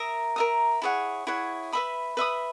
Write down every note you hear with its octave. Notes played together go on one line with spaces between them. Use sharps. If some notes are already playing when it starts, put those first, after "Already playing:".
Already playing: A#4 E5 A#5 D#6
A#4 E5 A#5 D#6
E4 G#4 C#5 F#5
E4 G#4 C#5 F#5
B4 E5 B5 D#6
B4 E5 B5 D#6